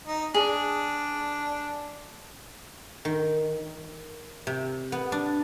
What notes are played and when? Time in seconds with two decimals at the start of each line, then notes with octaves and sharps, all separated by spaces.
0.07 D#4
0.34 D4 G#4
3.05 D#3
4.47 C3
4.92 B3
5.12 D4